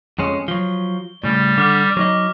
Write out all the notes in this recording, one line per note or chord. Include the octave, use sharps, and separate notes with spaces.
F2 G#3 C#4
F3 F#3 G7
A2 C#3 G3
D3 D6 F6 B6
F#3 D#4 D#5